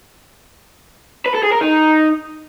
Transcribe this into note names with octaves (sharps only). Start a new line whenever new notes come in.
B4
A4
G#4
A#4
D#4